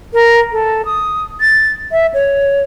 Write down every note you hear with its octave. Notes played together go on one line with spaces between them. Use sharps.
A#4
A4
D#6
A6
E5
C#5